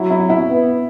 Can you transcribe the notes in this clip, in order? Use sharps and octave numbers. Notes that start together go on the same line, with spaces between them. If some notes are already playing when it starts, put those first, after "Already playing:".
Already playing: F#3 E4
E4
E4
B3